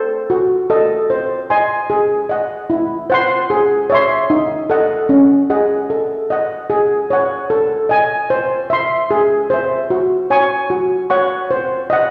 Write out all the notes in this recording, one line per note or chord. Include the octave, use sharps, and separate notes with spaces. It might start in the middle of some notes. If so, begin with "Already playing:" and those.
Already playing: A4 C5
F#4
A4 D#5
C5
D#5 G#5 C6
G#4
D#5 F#5
E4
C5 F#5 C6
G#4
C#5 E5 C6
D#4
A4 D#5 F#5
C#4
G#4 D#5 F#5
A4
D#5 F#5
G#4
C#5 F#5
A4
D#5 G#5
C5
E5 C6
G#4
C5 E5
F#4
C#5 G#5 C#6
F#4
C#5 F#5 C#6
C5
D#5 F#5